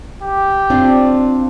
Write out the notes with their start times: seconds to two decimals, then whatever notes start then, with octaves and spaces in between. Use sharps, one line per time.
0.23 G4
0.70 C4 D4 F4